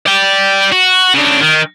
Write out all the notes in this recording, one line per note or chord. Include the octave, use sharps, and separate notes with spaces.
D5 G5
F#4
C#3 D4
D#3